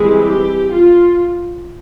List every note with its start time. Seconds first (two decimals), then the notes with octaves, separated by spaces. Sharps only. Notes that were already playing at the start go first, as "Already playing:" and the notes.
Already playing: E3 G3 G#3 C4 E4 G#4
0.23 G4
0.73 F4